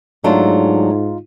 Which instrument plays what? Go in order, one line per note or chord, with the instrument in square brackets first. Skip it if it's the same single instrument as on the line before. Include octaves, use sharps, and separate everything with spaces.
[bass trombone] G#2 [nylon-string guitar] F#3 A3 D4 [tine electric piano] D#4 F4